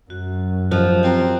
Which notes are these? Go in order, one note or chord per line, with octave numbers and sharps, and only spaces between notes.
F#2 F#4
F3 F#4 G4 D#5
C4 F#4 A#5